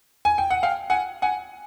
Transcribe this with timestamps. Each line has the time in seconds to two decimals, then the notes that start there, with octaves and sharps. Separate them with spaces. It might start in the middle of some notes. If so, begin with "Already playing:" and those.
0.25 G#5
0.38 G5
0.50 F#5
0.63 F5 G5
0.90 F#5 G#5
1.22 F#5 G#5